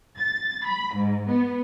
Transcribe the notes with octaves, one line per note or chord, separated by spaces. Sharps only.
A6
B5
G#2
B3